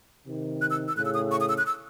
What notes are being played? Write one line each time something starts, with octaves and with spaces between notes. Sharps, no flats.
C3 D#3
F#6
E6
E6
A2 C#3 F#6
E6
D#6
C#6
D#6
E6
F#6
E6